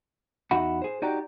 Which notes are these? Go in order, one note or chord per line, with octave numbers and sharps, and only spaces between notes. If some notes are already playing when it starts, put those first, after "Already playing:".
E2 D#4 F#4 E5 F#5 B5
G#4 C5
D#4 F#4 G4 D5 G5 A#5